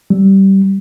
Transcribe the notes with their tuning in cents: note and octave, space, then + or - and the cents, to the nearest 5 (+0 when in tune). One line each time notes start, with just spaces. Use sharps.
G3 -20